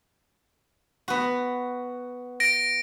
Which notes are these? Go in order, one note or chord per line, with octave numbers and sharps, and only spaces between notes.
B3 F#4
A#6 D7